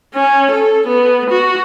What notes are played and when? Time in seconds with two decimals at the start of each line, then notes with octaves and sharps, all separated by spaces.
0.15 C#4
0.51 A4
0.87 B3
1.30 F#4